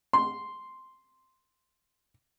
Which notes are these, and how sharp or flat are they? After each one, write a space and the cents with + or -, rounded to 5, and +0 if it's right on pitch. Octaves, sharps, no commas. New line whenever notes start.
C6 +0